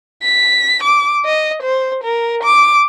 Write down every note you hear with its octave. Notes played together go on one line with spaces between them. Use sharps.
B6
D6
D#5
C5
A#4
D6